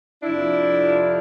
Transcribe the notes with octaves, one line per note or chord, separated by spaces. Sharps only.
F2 C3 F3 D4 E4